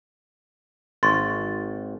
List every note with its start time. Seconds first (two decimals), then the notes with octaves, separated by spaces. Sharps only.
1.03 G#1 C6 C#6 A6